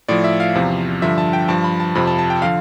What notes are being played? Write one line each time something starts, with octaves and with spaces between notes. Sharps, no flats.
A2 F3 D5
E5
F5
E2 C3 F3
G2 D3 F3 E5
A5
G5
G2 F3 A5
B5
A5
F2 C3 F3 B5
A5
A5
G5
D3 F3 F5